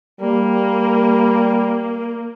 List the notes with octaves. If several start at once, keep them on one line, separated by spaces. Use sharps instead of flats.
G3 A#3